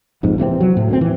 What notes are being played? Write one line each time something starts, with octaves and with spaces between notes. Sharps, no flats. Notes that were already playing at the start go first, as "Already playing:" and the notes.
A#1 F2 G#2
C3 E3 G#3 C4
F#3
A2
D2 A#3 C4
E3